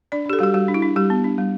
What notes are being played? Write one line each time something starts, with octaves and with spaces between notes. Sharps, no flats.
D4 D5
D4 G4
A4
G3 F#4 G4
G3 F#4
D4
E4
D4
G3 G4
B3
D4
G3